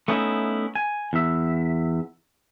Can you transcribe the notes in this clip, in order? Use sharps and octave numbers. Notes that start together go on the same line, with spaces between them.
A3 B3 C#4 D#4 E4
G#5
E2 E5